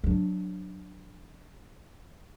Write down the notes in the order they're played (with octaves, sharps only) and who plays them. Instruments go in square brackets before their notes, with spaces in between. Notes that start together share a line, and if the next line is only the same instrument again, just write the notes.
[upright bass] F#3 D4